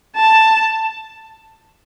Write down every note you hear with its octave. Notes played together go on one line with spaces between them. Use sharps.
A5